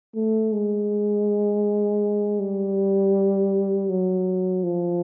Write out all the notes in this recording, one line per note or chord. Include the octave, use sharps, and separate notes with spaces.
A3
G#3
G3
F#3
F3